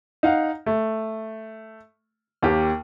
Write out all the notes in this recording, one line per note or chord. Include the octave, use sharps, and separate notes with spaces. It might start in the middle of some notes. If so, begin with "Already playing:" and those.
D#4 F5 F#5
A3
D#2 A#3 G4 A#4